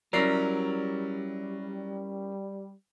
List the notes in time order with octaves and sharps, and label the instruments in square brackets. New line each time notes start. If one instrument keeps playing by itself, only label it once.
[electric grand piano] F#3 D5 C7 [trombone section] G3 [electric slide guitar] C#4 E4 A#4